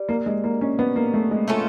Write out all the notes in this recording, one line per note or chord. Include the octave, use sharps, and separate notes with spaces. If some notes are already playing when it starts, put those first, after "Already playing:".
Already playing: G3
A#3
G#3
A#3
C#4
B3
A#3
A3
G#3
A3 C#4 F4 A4